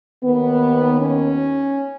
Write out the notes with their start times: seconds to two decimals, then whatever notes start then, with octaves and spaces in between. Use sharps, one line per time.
0.24 D#2 D#3 B3
1.01 C#4